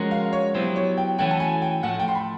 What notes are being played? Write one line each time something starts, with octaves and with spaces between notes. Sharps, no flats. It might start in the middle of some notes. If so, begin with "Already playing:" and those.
Already playing: F3 G#3 C#4 F#4 A#4
F5
C#5
F#3 B3 E4 G4 C5
C#5
G5
E3 A3 C#4 F#4 G5
A5
G#5
G5
A2 F3 A3 F#5
G5
C6
B5